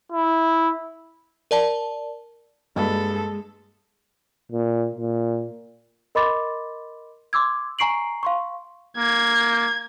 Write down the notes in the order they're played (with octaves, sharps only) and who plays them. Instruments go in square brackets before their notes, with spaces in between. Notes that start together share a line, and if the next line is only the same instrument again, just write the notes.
[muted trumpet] E4
[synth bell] A#4 D5 A5
[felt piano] G2 B5 [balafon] G3 A#3 F#4 [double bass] G#3 [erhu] A4
[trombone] A#2
A#2
[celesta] A#4 D#5 B5 C6 D6 A6
C6 D6 E6 G#6
G#5 A#5 C#6 C7 D7 F#7
F5 C6 C#6
[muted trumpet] A#3 [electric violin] G#6